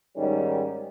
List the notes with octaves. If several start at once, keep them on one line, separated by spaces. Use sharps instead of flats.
G#2 D#3 G3 C#4